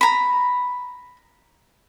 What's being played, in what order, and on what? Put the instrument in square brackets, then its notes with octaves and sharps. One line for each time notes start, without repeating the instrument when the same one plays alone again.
[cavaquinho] A#5 B5